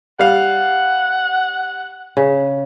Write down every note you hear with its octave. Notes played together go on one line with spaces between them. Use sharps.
G3 F5 F#5
C#3